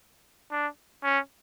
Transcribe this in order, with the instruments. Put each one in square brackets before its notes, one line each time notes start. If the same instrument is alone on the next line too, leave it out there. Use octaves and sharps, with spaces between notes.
[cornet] D4
C#4